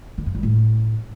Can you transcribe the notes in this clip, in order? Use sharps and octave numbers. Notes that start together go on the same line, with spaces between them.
D3
F#2
G3
A2